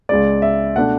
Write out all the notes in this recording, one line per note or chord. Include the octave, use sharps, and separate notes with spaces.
C#2 C#3 G#3 D5
E5
B2 A3 D4 F#5